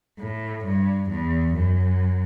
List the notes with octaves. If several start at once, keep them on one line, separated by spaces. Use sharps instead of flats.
A2
G2
E2
F#2